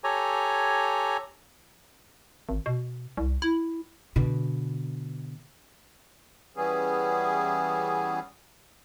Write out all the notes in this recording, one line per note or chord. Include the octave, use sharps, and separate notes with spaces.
G4 A4 C#5 G#5 A#5
G#1
B2
C2
E4
B2 D3
E3 G3 B3 C#4 G#4